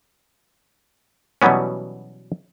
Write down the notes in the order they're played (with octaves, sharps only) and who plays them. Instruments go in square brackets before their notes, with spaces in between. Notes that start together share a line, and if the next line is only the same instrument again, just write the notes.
[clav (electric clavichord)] B2 E3 F#3 G3 B3 C#4